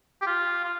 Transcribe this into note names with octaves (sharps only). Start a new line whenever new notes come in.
G4
F4
F4